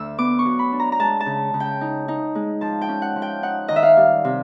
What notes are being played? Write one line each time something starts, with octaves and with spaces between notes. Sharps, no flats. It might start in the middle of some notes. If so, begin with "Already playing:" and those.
Already playing: D2 E6
B3 D6
C#6
F#3
B5
D4
A#5
A#5
G#3 A5
A5
C#3
C#3
G5
D#4
D#4
G#3
F3 A5
G5
C#4
F#5
F3
G5
D#4 F#5
D#3 D#5
E5
F5
G3
C3